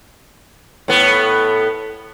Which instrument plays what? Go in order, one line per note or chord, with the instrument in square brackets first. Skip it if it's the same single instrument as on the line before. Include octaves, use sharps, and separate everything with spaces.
[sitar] A2 B3